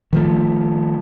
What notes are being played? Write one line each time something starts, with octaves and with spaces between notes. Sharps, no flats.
D#3 F3 A3